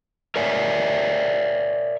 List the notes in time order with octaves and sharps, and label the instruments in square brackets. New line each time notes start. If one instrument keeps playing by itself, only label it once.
[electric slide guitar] A#4 C#5 D5 E5 G#5